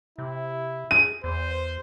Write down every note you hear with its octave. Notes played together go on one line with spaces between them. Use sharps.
C3 E4
G#4 D#7
E2 C5